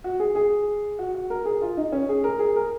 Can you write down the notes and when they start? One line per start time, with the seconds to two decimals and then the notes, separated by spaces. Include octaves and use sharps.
0.04 F#4
0.20 G#4
0.35 G#4
0.99 F#4
1.14 F#4
1.30 A#4
1.45 G#4
1.61 F4
1.77 D#4
1.92 C#4
2.09 G#4
2.24 A#4
2.39 G#4
2.56 A#4